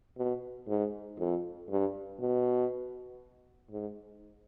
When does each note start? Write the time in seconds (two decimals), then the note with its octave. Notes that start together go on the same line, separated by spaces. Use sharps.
0.17 B2
0.68 G#2
1.19 F2
1.70 G2
2.20 B2
3.71 G#2